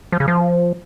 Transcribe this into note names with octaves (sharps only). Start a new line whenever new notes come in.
F3
C#3
F3